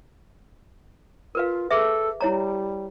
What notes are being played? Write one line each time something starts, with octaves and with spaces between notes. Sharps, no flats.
F4 A#4 B4 F5
G#4 A4 B4 E5
G3 E4 C#5 A#5